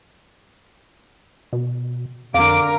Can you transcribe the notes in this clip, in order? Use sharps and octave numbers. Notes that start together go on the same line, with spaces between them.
B2
F2 D3 A#4 F5 D6